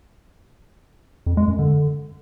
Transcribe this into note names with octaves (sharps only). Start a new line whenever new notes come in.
F2
G#3
F#2
D3